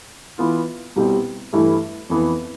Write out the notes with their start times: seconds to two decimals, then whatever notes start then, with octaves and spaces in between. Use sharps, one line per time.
0.38 E3 B3 F4
0.96 C2 B2 G3 C4
1.53 G2 E3 A3 E4
2.10 F2 E3 B3